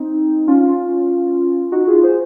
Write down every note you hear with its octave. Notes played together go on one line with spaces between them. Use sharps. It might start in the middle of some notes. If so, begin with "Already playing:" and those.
Already playing: C4 D#4
C#4 F4
D#4 F#4
F4 G#4
G#4 C5